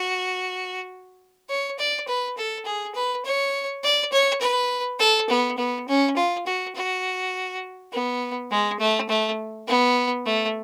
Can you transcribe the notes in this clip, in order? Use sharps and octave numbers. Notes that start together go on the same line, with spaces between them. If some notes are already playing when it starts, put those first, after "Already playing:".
Already playing: F#4
C#5
D5
B4
A4
G#4
B4
C#5
D5
C#5
B4
A4
B3
B3
C#4
F4
F#4
F#4
B3
G#3
A3
A3
B3
A3